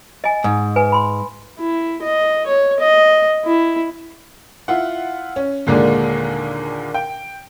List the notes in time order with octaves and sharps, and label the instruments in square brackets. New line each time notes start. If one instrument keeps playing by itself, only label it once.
[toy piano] D#5 G#5
[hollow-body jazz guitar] G#2
[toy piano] B4 G#5
B5 C6
[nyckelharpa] E4
D#5
C#5
D#5
E4
[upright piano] E4 F4 F#5
C#4
D#2 A#2 D3 G#3 A#3 D4
G5